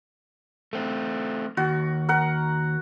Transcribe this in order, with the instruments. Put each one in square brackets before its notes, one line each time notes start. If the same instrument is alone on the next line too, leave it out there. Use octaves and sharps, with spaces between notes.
[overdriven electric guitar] A3 C4
[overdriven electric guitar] D#2 [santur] F#4
[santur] A#4 F#5